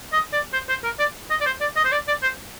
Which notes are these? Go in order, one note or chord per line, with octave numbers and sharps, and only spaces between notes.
D#5
D5
C5
C5
A#4
D5
D#5
D5
C5
D5
D#5
C5
D5
D5
C5